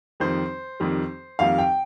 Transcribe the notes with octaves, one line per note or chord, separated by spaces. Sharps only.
F2 D#3 G3 C5
F2 D#3 G3
F2 D#3 G3 F5
G5